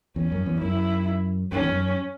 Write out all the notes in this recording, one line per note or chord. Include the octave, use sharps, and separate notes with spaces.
E2 C#4
F#2
E2
F#2 E4
F#2 C#4
E2
F#2